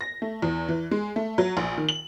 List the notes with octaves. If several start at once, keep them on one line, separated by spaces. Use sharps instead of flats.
A#6
A3
E2
E3
G#3
A3
F#3
A#1
D#3
F#7